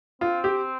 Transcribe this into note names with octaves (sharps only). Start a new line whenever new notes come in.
C4 F4
G4